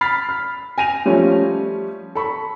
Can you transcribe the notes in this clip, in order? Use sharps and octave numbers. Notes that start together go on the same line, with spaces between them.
B5 F6 A6 B6 C7
F6
G#5 A#6 D#7 F7
F3 G3 A3 C#4 F4
A4 B5 C#6